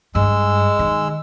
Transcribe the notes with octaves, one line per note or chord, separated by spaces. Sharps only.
G2 G#3 E6
D#3